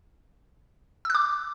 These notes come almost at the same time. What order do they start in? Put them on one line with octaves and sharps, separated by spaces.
E6 F#6 D6